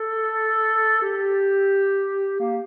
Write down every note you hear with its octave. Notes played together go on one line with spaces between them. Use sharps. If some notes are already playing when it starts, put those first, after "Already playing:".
Already playing: A4
G4
A#3